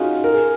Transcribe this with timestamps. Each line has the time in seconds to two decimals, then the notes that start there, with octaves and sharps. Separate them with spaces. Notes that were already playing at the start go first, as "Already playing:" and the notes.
Already playing: C#4 D#4 F4 F#4 G#4
0.24 A#4
0.34 G#4